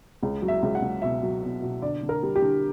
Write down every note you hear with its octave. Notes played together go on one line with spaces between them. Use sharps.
C#2
F#3
E5
C#2
F#5
C#2
B2 E5
F#3
B2
B2
D3 D5
D3
A#4
G3
G4
D3